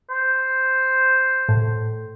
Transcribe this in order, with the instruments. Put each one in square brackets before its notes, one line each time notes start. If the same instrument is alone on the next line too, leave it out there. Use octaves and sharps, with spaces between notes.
[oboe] C5
[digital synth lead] A2